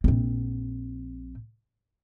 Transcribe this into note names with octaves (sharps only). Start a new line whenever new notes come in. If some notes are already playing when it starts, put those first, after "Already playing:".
A#1 C4